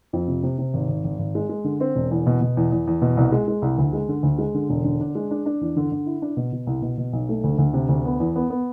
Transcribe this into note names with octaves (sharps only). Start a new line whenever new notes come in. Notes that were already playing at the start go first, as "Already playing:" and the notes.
F2
C3
C3
C3
G#1
G#1
G#1
G#1
G#3
G#3
D3
C4
E1
E2
B2
B2
E2
E2
E2
B2
C2
G#3
G#3
C2
D2
G#3
D3
D2
G#3
D3
E1
D3
D4
G#3
D4
D4
E2
D3
D3
E4
D4
B2
B2
C2
B2
B2
B1
A3
D2
D2
C3
D2
B3
E2
B3
B3